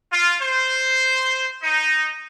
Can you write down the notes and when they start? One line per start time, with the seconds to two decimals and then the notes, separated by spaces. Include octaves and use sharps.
0.11 F4
0.40 C5
1.62 D#4